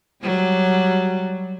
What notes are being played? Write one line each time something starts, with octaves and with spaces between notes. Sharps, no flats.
F#3 G3